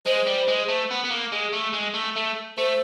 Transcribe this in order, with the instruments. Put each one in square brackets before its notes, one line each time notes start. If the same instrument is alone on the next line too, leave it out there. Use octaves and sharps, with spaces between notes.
[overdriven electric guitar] G#3 [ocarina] C5
[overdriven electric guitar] G3
G#3
A3
B3
B3
A#3
G#3
A3
G#3
A3
A3
[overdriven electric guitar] A3 [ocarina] C5